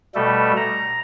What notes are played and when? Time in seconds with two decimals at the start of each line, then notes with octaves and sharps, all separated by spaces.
0.15 B2 G3 A3 A4
0.56 A#5